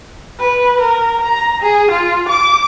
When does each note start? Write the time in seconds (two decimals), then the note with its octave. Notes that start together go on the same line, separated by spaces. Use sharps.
0.39 B4
0.80 A#4
1.21 A#5
1.62 G#4
1.91 F4
2.29 D6